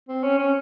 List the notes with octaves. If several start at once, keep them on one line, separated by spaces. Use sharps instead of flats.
C4
C#4
C#4